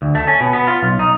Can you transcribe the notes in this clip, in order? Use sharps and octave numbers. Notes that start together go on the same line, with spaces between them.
D2
A3
C#4
B2
B3
F4
B1
D#4